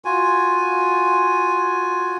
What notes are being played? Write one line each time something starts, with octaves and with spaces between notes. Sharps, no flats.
F4 F#4 G#5